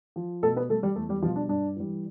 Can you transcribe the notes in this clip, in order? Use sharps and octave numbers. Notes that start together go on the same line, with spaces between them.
F3
B2 A3 A4
B3 B4
G3 A3 A4
G3 G4
E2 A3 A4
G3 G4
B2 F3 G3 F4
D4
G2 D4
E3 G3